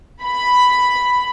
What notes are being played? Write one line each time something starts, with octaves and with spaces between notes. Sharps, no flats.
B5